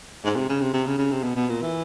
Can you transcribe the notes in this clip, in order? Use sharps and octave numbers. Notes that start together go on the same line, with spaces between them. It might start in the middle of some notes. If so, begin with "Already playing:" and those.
G#2
C3
C#3
C3
C3
C#3
C#3
C3
B2
B2
A#2
E3